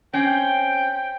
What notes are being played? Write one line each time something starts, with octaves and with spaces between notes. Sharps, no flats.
C4 C#4 G5